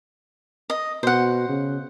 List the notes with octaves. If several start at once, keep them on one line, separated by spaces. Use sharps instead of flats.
D#5
B2 C5 F#5
C#3